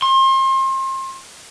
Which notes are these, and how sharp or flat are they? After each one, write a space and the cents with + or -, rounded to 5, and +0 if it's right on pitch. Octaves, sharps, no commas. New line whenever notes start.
C6 +35